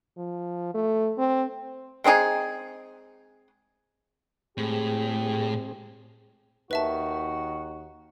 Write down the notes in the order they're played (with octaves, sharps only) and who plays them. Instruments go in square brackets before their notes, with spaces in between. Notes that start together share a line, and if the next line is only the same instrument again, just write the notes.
[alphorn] F3
A3
C4
[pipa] G#3 C4 D#4 G#4
[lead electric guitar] A2 [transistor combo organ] G#3 C4 [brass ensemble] G4 G#4
[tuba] D#2 [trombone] D#3 [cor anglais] F#4 [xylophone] B4 E5 A5